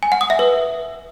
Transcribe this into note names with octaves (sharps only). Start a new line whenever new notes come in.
G#5
F#5
D#6
E5
B4